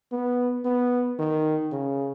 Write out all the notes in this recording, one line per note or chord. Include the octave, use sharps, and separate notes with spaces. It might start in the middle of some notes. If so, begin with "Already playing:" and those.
B3
B3
D#3
C#3